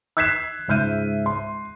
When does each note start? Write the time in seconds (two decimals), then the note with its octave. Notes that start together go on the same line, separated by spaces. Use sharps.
0.17 E6 F#6 G#6 B6 C7 E7
0.68 C#2 G#2 E5 F6 G6 D#7
1.26 C6